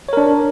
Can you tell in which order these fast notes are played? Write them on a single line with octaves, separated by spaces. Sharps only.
C#5 A#4 D4